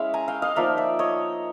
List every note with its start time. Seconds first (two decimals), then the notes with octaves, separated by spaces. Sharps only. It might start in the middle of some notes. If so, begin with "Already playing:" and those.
Already playing: G#3 C#4 E4 F5
0.14 G#5 A#5
0.28 F5 G5
0.42 D#5 F5
0.56 F3 A#3 D#4 D5 E5
0.77 D5 E5
0.99 C#5 D#5